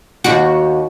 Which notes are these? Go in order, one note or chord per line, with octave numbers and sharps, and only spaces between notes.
D#2 F#4